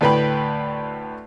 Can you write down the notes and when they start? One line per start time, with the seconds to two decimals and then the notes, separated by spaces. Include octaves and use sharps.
0.01 D2 A2 B4 G5 B5